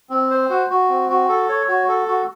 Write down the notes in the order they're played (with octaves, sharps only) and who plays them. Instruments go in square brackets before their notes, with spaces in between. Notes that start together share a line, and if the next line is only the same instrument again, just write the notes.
[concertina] C4
C5
F#4
F#4
C4
F#4
A4
C#5
F#4
A4
F#4